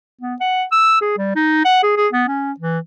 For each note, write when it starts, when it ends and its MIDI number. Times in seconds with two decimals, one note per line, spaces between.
0.21 0.35 59
0.40 0.63 78
0.72 1.01 88
1.01 1.15 68
1.18 1.31 55
1.36 1.62 63
1.65 1.82 78
1.83 1.95 68
1.97 2.08 68
2.13 2.24 59
2.28 2.52 61
2.60 2.79 52